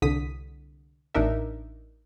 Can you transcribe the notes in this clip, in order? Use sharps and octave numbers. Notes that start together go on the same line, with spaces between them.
C2 D3 D#6 B6
A1 D4 D#4 A#4 E5